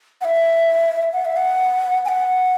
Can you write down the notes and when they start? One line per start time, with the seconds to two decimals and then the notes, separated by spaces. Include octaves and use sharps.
0.21 F#5
0.24 E5
1.13 F#5
1.25 E5
1.37 F#5
2.05 G#5
2.08 F#5